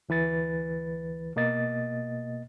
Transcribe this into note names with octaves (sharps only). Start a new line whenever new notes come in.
D2 E3 B4 A6
B2 A#3 D#5 A6